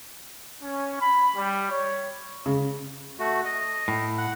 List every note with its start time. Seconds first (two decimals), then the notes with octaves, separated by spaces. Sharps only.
0.63 C#4
1.01 B5
1.36 G3
1.71 C#5
2.46 C#3
3.19 A3 F#4
3.45 D#5
3.88 A2
4.18 F#5